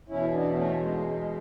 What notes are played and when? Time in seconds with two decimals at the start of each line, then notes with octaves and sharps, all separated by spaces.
0.09 E2 B2 C#4 E4
0.32 B3 D4
0.56 A3 C#4
0.79 G#3
1.14 G#3